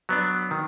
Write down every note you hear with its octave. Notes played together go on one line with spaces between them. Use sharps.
F#3 B3 D4
D#3